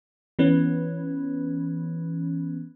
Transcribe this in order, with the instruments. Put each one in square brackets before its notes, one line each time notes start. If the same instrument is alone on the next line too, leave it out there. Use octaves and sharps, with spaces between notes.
[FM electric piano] E3 B3 C#4